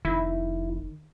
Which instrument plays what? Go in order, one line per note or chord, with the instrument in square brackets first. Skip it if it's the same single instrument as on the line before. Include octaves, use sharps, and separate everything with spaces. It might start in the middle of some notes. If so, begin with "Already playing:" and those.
[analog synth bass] F1 [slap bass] D#3 [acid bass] E4